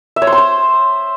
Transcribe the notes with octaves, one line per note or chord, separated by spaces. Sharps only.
E5
C#5
C5
C6
C5